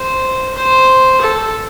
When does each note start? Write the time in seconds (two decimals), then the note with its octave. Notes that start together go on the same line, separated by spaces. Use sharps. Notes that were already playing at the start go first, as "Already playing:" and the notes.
Already playing: C5
0.55 C5
1.21 A4